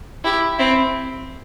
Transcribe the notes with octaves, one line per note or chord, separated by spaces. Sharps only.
E4 G4
C4 E4